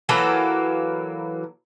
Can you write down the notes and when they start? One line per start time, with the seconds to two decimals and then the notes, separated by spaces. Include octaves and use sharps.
0.09 E3 F#3 A#3 A4